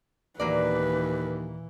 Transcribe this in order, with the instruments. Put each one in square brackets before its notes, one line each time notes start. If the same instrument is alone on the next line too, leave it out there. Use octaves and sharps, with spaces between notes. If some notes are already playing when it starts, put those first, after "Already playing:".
[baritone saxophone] D#2 [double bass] A#2 E3 [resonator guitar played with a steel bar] F#3 A#3 D5 [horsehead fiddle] B4